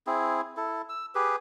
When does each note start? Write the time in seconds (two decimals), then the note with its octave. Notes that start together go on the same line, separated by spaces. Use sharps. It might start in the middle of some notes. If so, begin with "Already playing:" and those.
0.07 C4 E4 G#4
0.57 E4 A4
0.89 E6
1.15 G4 G#4 B4